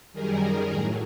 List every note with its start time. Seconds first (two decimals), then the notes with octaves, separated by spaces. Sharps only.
0.13 F#2 D#3 G3 G#4 A#4
0.70 A2 F#3 G#4 A#4